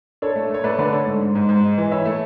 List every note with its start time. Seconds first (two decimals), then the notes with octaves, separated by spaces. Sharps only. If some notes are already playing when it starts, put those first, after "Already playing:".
0.22 D4 A4 C#5
0.36 A3
0.50 A3 C#5
0.64 A3 B4 D5
0.78 D3 B4 D5
0.92 D4 A4 C#5
1.07 G#2
1.21 G#2
1.35 G#2
1.49 G#2
1.63 G#3
1.78 E3
1.91 E4 C#5 E5
2.05 A3